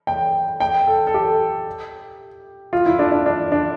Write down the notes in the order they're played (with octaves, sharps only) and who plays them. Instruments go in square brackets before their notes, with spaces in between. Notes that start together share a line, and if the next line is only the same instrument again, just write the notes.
[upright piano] G5
G5
A4
A4
G4
F4
E4
D4
D4
D4
D4